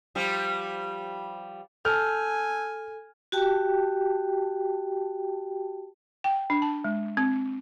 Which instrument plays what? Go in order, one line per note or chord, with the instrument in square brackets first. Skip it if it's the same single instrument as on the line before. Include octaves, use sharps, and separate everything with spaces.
[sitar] F3 G3
[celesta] A4 [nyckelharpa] G#5 [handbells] A5 E6 G6 [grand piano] F6
[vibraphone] F#4 G4 G5 A5
[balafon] G5
D4
A5
G#3
C4